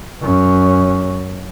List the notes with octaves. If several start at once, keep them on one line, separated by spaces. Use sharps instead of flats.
F#2 C#4